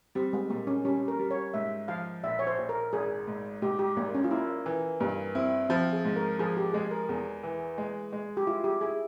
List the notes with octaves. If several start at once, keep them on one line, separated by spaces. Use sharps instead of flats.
G3 C4
G#3
A#2 A#3
C#4
G3 C#4
A#4
G3
C#5
G#2 E5
F3 F5
A#1 E5
C#5
C5
A#1
A#4
G#1 G#4
G#2
G#2 G4
G4
G#1 A#3
C#4
F4
A#3 E4
E3
G2 A#3
C4 E4
F3 C4
G#4
G#2
A#4
F3 G#4
G4
G#3 G#4
A#4
E2 G#4
E3
G#3
G#3
G4
E4 F4
G4
E4 G#4